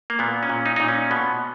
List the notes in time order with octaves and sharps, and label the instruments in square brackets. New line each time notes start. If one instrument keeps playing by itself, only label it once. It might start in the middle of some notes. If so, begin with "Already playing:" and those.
[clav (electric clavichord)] A#3
A#2 B3
C#4
A#2
D#4
A#2 D#4
C#4
B2 B3